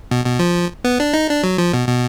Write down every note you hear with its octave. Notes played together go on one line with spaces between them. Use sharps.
B2
B2
F3
B3
D4
D#4
D4
F#3
F3
B2
B2